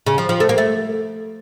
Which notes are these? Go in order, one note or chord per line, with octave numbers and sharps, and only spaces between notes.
C#3
F3
F3
A3
A#3
A3